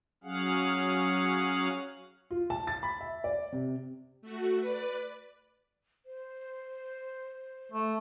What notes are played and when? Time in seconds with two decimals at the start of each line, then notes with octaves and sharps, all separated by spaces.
0.24 F#3 C#4 G#4 F5 F#5
2.31 F4
2.50 A5
2.67 A6
2.83 B5
3.01 E5
3.24 D5
3.53 C3
4.22 A3 F#4
4.60 B4 D5
6.06 C5
7.72 A3